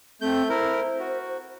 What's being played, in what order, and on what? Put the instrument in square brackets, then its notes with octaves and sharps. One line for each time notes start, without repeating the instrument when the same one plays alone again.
[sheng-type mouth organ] A3 G6 [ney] C4
[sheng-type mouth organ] E4 A#4 [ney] C5
[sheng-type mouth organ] F#4